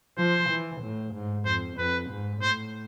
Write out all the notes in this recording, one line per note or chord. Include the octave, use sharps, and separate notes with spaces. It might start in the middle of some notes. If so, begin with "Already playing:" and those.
F3 C5
E3
A2
G#2
F2 C5
F2 B4
G#2
A2 C5